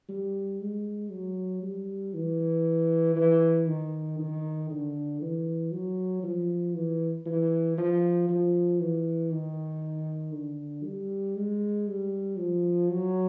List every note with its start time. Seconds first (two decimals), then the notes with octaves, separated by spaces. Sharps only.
0.09 G3
0.60 G#3
1.11 F#3
1.62 G3
2.14 E3
3.16 E3
3.67 D#3
4.19 D#3
4.70 D3
5.21 E3
5.72 F#3
6.23 F3
6.74 E3
7.26 E3
7.77 F3
8.29 F3
8.79 E3
9.31 D#3
10.33 D3
10.84 G3
11.36 G#3
11.87 G3
12.38 F3
12.89 F#3